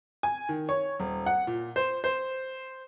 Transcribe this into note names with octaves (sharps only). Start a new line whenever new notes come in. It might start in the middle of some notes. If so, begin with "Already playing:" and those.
G#5
D#3
C#5
D#1
F#5
A#2
C5
C5